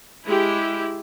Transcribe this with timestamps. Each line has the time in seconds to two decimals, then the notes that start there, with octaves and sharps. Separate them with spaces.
0.25 G#3 E4 G4